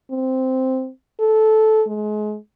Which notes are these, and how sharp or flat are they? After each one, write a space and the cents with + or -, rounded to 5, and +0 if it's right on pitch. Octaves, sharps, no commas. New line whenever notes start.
C4 -5
A4 -15
G#3 +30